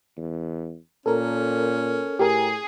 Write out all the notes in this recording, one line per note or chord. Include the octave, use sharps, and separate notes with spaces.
E2
A#2 C#4 A4 A#4
A2 G4 G#4 A#4